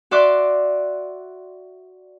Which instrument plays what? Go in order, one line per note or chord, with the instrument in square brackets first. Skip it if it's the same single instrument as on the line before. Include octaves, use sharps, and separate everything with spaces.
[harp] F#4 D5 E5 C6 D6 F#6